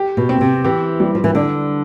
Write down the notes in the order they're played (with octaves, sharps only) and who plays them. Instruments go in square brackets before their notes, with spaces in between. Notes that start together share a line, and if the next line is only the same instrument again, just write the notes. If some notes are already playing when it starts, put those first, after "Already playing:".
Already playing: [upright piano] G4
[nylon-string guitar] B2
[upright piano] C4
[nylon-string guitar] C3
[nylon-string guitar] E3 [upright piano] G4
[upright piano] G3
[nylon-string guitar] F3
E3
[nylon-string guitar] D3 [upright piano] D4